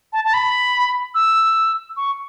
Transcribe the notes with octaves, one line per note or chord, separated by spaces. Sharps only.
A5
A5
B5
E6
C#6